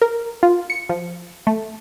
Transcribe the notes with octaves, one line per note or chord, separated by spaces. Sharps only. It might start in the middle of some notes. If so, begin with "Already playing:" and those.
A#4
F4
C#7
F3
A3